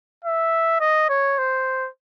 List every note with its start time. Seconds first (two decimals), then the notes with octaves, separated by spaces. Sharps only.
0.24 E5
0.80 D#5
1.09 C#5
1.38 C5